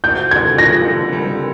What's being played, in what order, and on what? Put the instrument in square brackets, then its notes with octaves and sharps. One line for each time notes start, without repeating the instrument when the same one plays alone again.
[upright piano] D2 [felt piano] G6
[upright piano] D3 [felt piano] G#6
[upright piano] F3 [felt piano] A#6
[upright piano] D3
G3